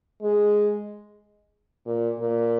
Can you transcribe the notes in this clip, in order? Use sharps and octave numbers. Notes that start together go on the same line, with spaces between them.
G#3
A#2
A#2